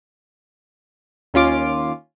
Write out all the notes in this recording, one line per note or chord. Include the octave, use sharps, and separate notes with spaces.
D#2 C#4 F4 D6